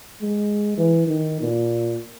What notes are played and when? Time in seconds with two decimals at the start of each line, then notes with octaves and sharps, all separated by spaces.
0.21 G#3
0.78 E3
1.07 D#3
1.40 A#2